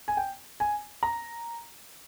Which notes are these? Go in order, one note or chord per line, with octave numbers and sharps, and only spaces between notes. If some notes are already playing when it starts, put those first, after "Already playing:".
G#5
G5
G#5
A#5